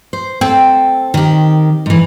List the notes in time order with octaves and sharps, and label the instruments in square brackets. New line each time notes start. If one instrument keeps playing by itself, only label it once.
[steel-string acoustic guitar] C5
[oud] C4 [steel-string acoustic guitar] A4
[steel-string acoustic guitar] D#3 G4
G#2 E3